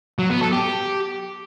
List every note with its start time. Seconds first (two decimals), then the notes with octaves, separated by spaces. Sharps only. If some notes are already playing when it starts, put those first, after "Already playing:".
0.19 F#3
0.30 B3
0.41 A4
0.52 G4